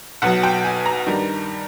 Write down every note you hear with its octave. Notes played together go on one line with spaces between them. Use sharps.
B1 B2 F#3 F#5
G5
G#5
A#5
G2 D#3 G3